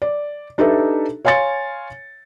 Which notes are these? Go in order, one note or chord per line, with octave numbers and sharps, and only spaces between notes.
D5
D4 D#4 G4 A4 B4 E5
C#5 F5 G#5 C6 A6 C#7